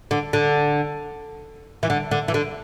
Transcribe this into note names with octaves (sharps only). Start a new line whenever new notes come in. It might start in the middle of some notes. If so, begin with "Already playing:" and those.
D3
D3
E3
D3
D3
E3
D3